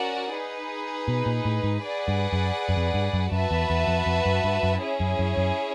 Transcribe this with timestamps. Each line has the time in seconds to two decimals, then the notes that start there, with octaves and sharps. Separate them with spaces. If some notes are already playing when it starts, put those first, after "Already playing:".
Already playing: C#4 F#4 A#4 D5 F#5
0.33 D#4 G#4 B4
1.08 B2
1.26 A#2
1.45 A2
1.64 G#2
1.82 G#4 B4 D5 F#5
2.08 G2
2.33 F#2
2.69 F#2
2.76 F2
2.94 G2
3.14 F#2
3.32 F#2 F#4 B4 E5 A5
3.51 E2
3.70 E2
3.88 F2
4.06 F2
4.26 F#2
4.44 G2
4.63 F#2
4.81 C#4 E4 G#4 C#5
5.00 F#2
5.19 F#2
5.37 F#2